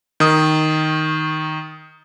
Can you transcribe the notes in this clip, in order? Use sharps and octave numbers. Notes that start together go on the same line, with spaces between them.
D#3 D#6